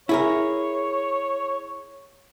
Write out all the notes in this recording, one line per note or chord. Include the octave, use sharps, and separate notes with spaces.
E4 G#4 A#4 C#5